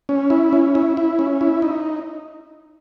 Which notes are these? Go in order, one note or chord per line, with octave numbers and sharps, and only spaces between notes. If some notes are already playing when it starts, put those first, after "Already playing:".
C#4
E4
C#4
E4
E4
C#4
E4
D#4